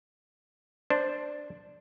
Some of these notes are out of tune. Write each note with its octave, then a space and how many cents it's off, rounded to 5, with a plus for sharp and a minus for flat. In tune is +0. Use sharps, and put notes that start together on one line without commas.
D4 +0 C5 +0